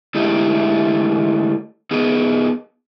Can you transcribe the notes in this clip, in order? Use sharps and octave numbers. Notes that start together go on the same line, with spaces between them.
D3 G#3 A3 D#4 E4 G4
B3 D#4 G#4